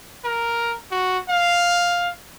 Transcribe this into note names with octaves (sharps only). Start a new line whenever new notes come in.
A#4
F#4
F5